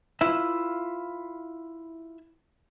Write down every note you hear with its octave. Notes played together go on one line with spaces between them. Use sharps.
E4 F4 B4 E5